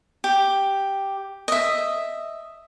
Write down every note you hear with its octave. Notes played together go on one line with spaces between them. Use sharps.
G4
D#5 E5